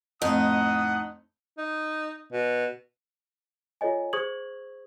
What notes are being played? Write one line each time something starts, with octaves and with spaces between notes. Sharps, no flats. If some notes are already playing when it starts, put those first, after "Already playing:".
F2 A2 D#4 F#5 D#6
D#4
B2
F4 A4 C#5 D#5 G#5
G#4 C5 C#6 D#6 G#6 F#7